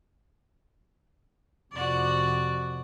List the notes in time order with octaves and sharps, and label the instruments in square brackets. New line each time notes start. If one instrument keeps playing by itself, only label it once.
[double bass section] F2 C3 [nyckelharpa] F#4 D5